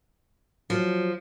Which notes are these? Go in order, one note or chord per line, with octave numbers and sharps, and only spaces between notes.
F3 F#3